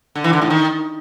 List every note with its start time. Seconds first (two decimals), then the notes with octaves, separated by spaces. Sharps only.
0.15 D3
0.24 E3
0.33 D3
0.42 A2
0.50 D#3